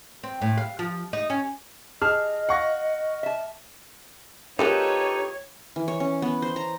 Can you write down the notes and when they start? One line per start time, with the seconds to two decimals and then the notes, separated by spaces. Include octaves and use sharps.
0.24 C4
0.42 A2
0.58 F5
0.79 F3
1.13 D#4
1.30 C#4
2.02 G#4 D#5 A5 F6
2.49 F5 F#5 C#6 A#6
3.23 E5 A5
4.59 F3 G#3 A#3 D#4 G4 A4 B4 C#5
5.76 E3
5.88 C#5
6.00 C#4
6.22 B3
6.42 C5
6.56 A#5